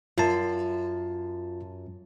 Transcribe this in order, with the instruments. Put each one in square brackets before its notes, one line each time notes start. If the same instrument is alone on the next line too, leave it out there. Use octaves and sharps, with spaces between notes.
[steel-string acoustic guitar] F#2 [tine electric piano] F4 A5